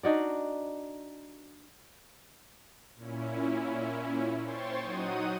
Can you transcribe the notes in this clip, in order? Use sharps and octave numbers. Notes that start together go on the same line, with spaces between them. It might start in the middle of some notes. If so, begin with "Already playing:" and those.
D4 D#4 F#4 D5
A#2 C#4 E4
C5 C#5 G5 C6 C#6 A6
F#3 D#4 F#5 D#6 D#7